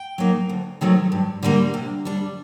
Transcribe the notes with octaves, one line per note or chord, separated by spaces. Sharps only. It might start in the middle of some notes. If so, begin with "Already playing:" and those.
Already playing: G5
F#3 A#3 D#4
D2
C3 D#3 F#3 A3
G2
D3 G3 A#3
C3
G3 D4